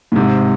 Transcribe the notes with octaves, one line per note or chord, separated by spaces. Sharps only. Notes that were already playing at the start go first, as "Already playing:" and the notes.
A2
G#2 C3